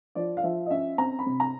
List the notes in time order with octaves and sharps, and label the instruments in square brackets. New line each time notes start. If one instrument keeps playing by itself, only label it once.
[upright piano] F3 D5
F5
F3 E5
D#5
C#4 E5
C4 A#5
B5
C3
A#5